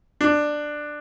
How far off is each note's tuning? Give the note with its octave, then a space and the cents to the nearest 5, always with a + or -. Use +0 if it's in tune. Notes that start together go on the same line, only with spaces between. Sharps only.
D4 +10